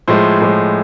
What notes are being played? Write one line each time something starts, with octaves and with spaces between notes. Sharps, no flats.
A2 F3 G#3 C5
A2 F3 G#3